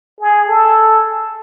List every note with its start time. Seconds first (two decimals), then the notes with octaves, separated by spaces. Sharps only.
0.20 G#4
0.48 A4